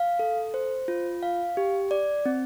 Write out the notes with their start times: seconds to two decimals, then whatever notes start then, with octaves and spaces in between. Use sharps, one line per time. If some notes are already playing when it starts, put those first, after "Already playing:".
Already playing: F5
0.19 A4
0.54 C5
0.88 F4
1.23 F5
1.57 G4
1.91 D5
2.26 C4